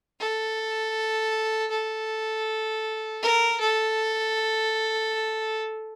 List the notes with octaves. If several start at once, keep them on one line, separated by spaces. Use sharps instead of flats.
A4
A4
A#4
A4